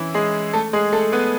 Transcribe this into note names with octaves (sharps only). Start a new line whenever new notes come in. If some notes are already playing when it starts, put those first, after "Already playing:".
Already playing: E3 C#4 E4
G#3 G#4
A3 A4
G#3 G#4
A3 A4
B3 B4